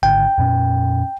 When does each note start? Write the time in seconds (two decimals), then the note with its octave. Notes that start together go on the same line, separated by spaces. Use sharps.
0.03 G#1 D3 G5
0.38 F2 A#2 C#4